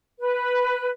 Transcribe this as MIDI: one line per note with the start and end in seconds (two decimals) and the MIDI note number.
0.19 0.90 71